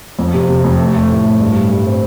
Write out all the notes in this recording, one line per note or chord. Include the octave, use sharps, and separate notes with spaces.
F2
C3
C3
F2
A3
A3
A2
A3
G2
G3
G3
C4